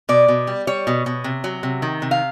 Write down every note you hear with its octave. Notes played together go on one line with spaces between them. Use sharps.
B2 D5
B2
G3
G3 C#5
B2
B2
C3
F#3
C3
D#3
C3
F5